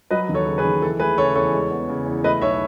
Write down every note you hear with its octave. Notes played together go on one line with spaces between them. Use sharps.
F#3 B4 D#5
D#2
A4 C#5
C#3
G#4 B4
D#2
E3 A4
A3 G#4 B4
C#3 A4 C#5
E2 A4 C#5
G#3
B3
C#3
E2
A3 B4 D#5
B1 C#5 E5